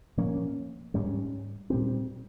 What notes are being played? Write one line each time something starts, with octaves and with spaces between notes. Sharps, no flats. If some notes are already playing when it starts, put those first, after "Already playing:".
A#2 F3 A#3 C#4
G#2 G3 C#4
A#2 G3 C4